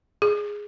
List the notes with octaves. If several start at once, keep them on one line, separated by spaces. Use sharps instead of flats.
G#4